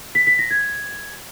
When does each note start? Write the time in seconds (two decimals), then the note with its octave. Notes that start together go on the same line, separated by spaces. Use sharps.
0.15 B6
0.27 B6
0.39 A#6
0.51 G#6